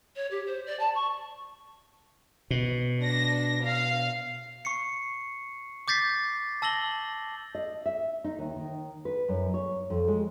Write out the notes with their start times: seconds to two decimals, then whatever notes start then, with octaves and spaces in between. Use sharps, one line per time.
0.16 C#5
0.31 G4
0.46 C5
0.66 D5
0.79 A5
0.95 C#6
2.51 B2
3.01 D4 A#6
3.65 F5
4.65 C#6 C7 C#7
5.88 D6 G6 A6 B6 C7
6.62 A5 E6 A#6 F#7 G7
7.55 D#5
7.86 E5
8.24 D#4
8.39 D#2
8.56 D#3
9.05 B4
9.29 F#2
9.54 C#5
9.90 F2
10.08 G#3